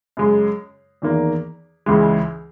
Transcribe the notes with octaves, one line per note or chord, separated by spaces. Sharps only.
F#2 C#3 G#3
E2 D#3 A#3
C#2 C#3 E3 G#3